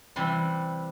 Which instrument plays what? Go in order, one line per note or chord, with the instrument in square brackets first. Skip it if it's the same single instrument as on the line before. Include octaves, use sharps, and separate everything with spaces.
[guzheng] C3 E3 G3 C6